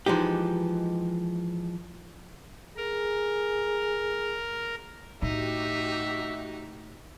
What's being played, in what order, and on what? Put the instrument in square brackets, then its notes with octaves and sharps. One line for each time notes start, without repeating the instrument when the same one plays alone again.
[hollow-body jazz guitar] E3 F3 G#3 D#4 G4
[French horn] G#4 [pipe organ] A#4
[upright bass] A2 [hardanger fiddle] D#4 [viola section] F#4 G4 [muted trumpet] E5